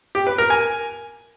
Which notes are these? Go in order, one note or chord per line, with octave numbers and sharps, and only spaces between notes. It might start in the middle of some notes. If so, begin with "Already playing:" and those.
G4
B4
A#4
G#5